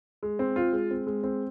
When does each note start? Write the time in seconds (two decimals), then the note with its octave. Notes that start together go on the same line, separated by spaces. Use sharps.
0.23 G#3
0.39 C4
0.56 F4
0.73 G#3
0.91 C4
1.07 G#3
1.24 C4